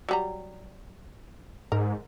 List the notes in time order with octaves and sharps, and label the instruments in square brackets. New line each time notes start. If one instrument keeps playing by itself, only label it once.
[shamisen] F#3 G3 A#5
[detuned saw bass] G#2 [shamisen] A#4